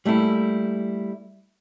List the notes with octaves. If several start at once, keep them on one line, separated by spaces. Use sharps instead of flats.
G3 A3 A#3 E4